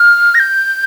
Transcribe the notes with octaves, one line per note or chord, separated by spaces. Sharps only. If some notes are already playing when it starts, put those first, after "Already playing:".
Already playing: F6
A#6
G6